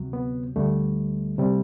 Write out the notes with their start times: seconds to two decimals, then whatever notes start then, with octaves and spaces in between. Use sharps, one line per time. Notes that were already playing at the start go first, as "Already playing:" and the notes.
Already playing: D2 C3 F#3
0.13 B3
0.56 D2 D3 G3 A3
1.38 C3 G3